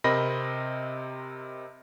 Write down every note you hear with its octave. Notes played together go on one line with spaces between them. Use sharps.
C3 C4 A#4 D#5 B5 A#6